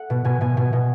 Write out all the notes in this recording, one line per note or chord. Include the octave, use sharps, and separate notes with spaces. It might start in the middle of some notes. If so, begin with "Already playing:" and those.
Already playing: A4 F#5
B2
B2 G#5
B2 G#5
B2 G#5
B2